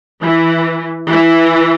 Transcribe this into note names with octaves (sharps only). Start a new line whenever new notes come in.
E3
E3